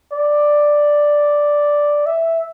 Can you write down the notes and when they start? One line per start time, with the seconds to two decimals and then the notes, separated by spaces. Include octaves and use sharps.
0.13 D5
2.06 E5